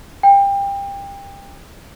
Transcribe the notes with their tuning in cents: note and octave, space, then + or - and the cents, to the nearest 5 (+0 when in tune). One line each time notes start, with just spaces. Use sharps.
G5 +25